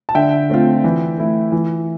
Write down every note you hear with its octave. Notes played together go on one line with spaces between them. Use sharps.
A5
D3 E5 G5
A3 C4 F4
E3
A3 E4
E3